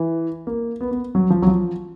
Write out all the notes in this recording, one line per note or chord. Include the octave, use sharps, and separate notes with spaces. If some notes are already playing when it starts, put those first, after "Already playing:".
Already playing: E3
A#3
B3
B3
F#3
F3
F#3
F3